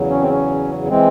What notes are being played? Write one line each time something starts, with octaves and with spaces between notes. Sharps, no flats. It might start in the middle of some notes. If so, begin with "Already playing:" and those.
Already playing: E2 C#3 F#3
C#4
C4
C#4
E3 G#3 C4